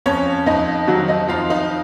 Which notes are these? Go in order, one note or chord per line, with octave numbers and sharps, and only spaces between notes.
F2 C#4 C#5
F2 D#4 D#5
D#3 F#3 F#4
D#4 D#5
F2 F4 F5
D#4 D#5